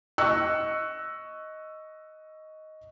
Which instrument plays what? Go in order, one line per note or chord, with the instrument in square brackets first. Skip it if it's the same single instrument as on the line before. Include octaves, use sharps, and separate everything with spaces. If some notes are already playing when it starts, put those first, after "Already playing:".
[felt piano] D#5 C#6 E6 F#6 C#7